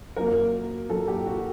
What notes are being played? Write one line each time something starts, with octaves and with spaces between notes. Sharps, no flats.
F#2 F#3 A#3 A#4
F#2 F#3 A#3 A4
G4
F#4